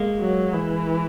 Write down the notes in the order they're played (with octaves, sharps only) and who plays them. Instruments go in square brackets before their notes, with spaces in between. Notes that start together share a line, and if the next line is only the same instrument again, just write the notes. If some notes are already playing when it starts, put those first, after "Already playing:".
Already playing: [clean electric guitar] G#3 A#3
[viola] F#3
E3